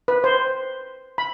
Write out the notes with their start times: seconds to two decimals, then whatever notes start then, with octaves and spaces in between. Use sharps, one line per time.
0.08 B4
0.24 C5
1.18 B5